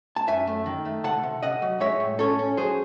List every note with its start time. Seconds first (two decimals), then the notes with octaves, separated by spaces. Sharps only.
0.16 A5
0.27 F#2 E5 G#5
0.47 A3
0.66 D#3
0.85 A3
1.04 C3 F#5 A5
1.23 C3
1.43 C3 D#5 F#5
1.62 F#3
1.80 G#3 C#5 E5
2.00 A2
2.19 C#4 A4 C#5
2.39 C#4
2.57 F#3 G#4 C5